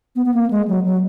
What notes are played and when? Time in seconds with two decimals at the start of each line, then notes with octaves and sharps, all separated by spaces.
0.16 B3
0.26 B3
0.34 A#3
0.51 G#3
0.68 F#3
0.85 F#3